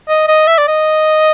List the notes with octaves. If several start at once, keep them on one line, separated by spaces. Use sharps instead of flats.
D#5
D#5
E5
D5
D#5